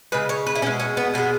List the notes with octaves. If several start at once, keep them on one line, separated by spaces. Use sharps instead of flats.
C#3 G#3 B4
C#5
B4
E4
B2 G#3 C#4
C#4
B3
B2 G#3 B3